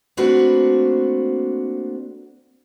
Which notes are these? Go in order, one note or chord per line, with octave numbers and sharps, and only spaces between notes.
A3 A#3 C4 D4 F#4 B4